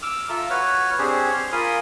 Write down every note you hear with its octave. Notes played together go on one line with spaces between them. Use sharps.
D6 E6 F6
F4 A4 E5 A#5 E6
F#4 B4 C#5 F6
C4 D4 G4 G#4 C5 C#5
C6 F6
F4 A#4 G#5 B5 C6 D#6